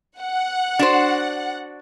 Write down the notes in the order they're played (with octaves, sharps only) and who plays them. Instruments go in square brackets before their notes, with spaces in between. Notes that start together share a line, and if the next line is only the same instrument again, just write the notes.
[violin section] F#5
[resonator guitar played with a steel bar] D4 F#4 C5